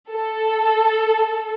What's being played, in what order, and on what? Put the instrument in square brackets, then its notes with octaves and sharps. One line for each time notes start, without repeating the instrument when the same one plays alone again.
[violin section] A4